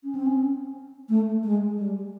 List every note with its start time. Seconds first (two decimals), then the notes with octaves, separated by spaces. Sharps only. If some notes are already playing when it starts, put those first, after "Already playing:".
0.04 C#4
0.15 C4
0.26 C#4
1.09 A3
1.44 G#3
1.78 G3